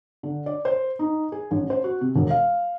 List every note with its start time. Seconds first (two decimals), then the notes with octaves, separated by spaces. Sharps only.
0.23 D3
0.46 D5
0.65 C5
0.99 D#4
1.32 G#4
1.51 A1
1.70 C5
1.84 F#4
2.01 C3
2.16 E1
2.30 F5